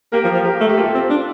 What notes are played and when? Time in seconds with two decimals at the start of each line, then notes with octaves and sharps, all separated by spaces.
0.12 A#3 G4 A#4
0.24 F3
0.34 F3
0.45 G4 A#4
0.61 A3
0.69 G4
0.77 A#3 F4 A4
0.94 C4
1.10 D4